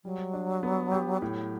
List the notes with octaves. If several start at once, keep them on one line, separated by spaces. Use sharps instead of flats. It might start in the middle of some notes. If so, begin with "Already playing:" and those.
F#3 G3
D4
B3
G4
A2 F#3